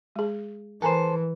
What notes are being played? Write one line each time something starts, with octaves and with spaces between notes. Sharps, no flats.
G#3 G#4
E3 A4 A#4 C5 G#5 A#5